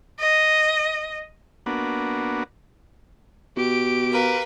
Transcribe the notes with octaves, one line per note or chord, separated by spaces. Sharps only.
D#5
A#3 B3 D4 F#4
B2 G4 D7
A#4 B4 F5